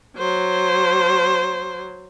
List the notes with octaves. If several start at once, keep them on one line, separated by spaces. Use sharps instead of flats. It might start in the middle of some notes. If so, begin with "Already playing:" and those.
F#3 C5